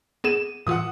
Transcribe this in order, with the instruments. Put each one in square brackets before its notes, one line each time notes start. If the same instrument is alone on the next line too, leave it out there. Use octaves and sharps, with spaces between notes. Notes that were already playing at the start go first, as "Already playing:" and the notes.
[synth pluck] B3 G#4 [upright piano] D#7 E7
[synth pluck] A2 E3 F4 [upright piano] F#5 D#6